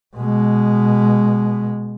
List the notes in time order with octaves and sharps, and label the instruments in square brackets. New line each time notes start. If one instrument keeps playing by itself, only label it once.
[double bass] B2 G#3